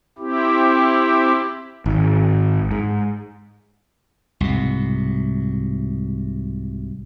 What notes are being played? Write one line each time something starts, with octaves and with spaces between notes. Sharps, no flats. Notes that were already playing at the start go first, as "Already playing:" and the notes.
C4 E4 G4
G#1
G#2
C2 G#2 B2